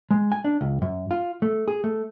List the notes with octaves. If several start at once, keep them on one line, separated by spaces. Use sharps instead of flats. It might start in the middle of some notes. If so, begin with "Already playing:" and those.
G#3
G#5
D4
C#2
F#2
F4
A3
G#4
A3